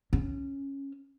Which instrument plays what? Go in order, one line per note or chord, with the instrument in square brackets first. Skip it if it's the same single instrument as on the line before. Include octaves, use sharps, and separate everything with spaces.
[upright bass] C#4